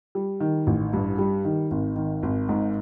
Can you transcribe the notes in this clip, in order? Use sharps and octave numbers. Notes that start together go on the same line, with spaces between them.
G3
D#3
A1
G2
G3
D#3
G#1
D#3
G#1
G#2